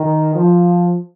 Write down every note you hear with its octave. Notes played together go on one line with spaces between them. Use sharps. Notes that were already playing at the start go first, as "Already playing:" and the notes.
Already playing: D#3
F3